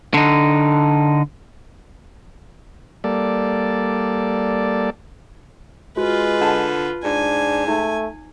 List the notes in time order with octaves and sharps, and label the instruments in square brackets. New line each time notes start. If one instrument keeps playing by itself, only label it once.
[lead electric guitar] D3 D#4
[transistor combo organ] G3 A#3 A4 D5
[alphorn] G#3 [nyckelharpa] F4 B4 [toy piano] F#4
[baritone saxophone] D3 [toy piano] F#5 A5
[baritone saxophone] G#2 [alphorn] D4 [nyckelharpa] G#5
[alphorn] A3 [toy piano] D#4